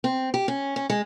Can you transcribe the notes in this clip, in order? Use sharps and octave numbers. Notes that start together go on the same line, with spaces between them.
C4
G4
C#4
C#4
G#3